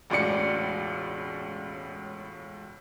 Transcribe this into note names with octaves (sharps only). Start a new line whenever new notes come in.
E1 C#2 A2 D5 C#7